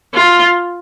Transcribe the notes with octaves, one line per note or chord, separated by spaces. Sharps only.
F4